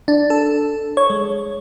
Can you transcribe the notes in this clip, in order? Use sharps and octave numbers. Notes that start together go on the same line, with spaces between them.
D4
A4
C#5
G#3